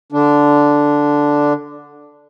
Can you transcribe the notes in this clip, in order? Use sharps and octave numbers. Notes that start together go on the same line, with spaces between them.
D3 D4